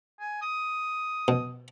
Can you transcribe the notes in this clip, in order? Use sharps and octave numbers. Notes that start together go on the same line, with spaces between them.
G#5
D#6
B2